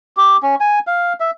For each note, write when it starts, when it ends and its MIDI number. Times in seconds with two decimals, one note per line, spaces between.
0.17 0.37 67
0.42 0.55 61
0.61 0.79 80
0.87 1.13 77
1.20 1.31 76